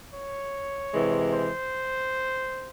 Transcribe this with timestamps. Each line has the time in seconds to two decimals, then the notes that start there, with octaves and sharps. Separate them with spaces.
0.12 C#5
0.92 C3 E3 G#3
1.32 C5